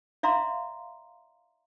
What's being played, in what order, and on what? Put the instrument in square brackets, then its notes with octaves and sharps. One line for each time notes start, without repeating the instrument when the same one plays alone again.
[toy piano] D5 E5 F5 A#5 C6